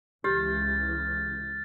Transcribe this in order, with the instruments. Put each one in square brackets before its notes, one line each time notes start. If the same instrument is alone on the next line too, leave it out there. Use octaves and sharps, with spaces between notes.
[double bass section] C#2 C#3 E3 [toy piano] G4 [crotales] F6 G6 A6